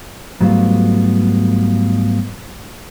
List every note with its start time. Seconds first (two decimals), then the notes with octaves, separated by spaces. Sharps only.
0.41 G#2 F#3 G3 A3 B3 F4